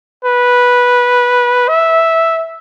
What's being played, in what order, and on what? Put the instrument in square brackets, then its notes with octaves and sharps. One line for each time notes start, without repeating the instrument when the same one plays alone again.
[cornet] B4
E5